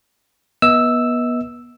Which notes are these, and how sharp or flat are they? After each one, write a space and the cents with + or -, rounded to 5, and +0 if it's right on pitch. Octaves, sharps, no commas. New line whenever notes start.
B3 -30 D#5 +40 E6 +0